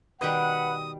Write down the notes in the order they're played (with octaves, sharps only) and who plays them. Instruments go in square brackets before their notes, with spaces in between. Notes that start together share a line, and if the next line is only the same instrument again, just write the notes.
[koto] B2 D#3 G3 [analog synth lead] B4 [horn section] F#5 [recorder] D#6